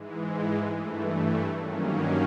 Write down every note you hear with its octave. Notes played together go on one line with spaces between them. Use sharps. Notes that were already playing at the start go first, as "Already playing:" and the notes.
Already playing: G#2 E3 G#3
G2 E3 A3
G2 D#3 F#3 A#3 C#4